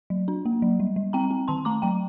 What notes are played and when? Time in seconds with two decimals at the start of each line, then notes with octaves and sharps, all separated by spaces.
0.10 F#3
0.28 D4
0.45 A#3
0.62 F#3
0.80 G3
0.96 G3
1.13 C4 G5 A#5
1.31 C4
1.48 D#3 A5 C6
1.65 A3 A#5 D6
1.82 F#3 G5 A#5